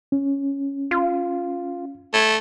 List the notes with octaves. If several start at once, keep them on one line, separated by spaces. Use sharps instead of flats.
C#4
F4
A3 G#6